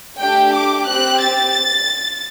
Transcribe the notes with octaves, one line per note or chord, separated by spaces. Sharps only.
A3 D4 G4 G5
D6
C4 G4 F#6
A6